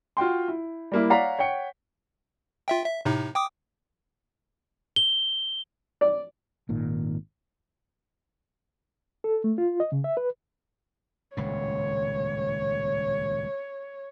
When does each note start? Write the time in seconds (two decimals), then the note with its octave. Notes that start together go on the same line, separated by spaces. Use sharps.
0.17 F4 F#4 G5 C6
0.48 E4
0.92 G3 A#3 E4
1.10 C#5 D5 F5 F#5 A#5 B6
1.39 C#5 F#5 G5 C#7
2.68 F4 E5 G5
2.85 E5
3.05 A2 C3 D#4
3.35 G5 D6 D#6
4.96 G7
6.01 D5
6.69 G#1 A#2 D#3
9.24 A4
9.44 A3
9.58 F4
9.80 D#5
9.92 C#3
10.04 E5
10.17 B4
11.37 D#1 C#2 A2 C#5